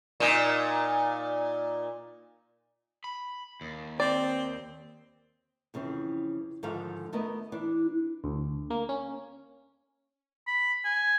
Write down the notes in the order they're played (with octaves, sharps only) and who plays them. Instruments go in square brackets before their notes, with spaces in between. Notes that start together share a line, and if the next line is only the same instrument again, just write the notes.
[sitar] A#2 D#4
[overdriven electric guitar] B5
D#2
[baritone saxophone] C4 [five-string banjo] D5
[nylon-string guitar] F2 C#3 E3 C4
G#2 D3 D#3 F3 G#4 F5
A3 B3 A#4 D5 D#5
E3 D4 D5
[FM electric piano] D2
A#3
C#4
[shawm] B5
G#5